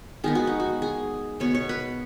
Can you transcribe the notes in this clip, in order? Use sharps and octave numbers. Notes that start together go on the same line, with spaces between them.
D#3 G#3 B3 G#4
F#4
D#4
F#4
G#4
B2 B3 C#5
C#5
B4